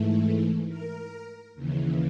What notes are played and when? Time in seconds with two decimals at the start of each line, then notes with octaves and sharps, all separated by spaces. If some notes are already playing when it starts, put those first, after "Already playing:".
Already playing: G#2 E3 A3
0.68 A#4
1.55 D#2 C#3 E3